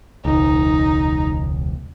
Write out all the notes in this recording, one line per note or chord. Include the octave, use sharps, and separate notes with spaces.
E1 C#2 D#4